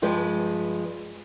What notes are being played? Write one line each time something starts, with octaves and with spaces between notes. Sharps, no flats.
G2 F3 G#3 B4